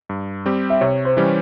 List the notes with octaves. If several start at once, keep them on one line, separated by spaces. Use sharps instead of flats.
G2
G3 C4 G4
E5
C3 C#5
C5
E3 G3 C#4 G4